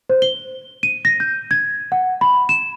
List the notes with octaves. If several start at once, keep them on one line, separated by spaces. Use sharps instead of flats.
C5
G7
D#7
A#6
G6
G#6
F#5
B5
E7